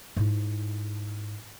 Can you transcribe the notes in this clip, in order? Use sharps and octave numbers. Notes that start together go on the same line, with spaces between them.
G#2 E4